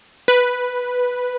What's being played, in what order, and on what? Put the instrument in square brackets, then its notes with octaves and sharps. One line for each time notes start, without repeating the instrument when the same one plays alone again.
[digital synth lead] B4